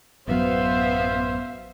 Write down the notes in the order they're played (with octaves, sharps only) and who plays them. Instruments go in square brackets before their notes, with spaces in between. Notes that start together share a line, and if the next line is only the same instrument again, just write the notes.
[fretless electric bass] A1 F#2 F#3 [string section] B3 [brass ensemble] C5 [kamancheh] E5 F5